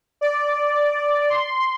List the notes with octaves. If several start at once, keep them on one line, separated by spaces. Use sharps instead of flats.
D5
C6